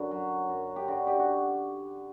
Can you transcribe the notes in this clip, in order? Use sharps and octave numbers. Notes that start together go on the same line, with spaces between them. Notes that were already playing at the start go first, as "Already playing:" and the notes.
Already playing: F#2 D3 F#4
F#3
F#2
G4
D3 F#4
G4
F#4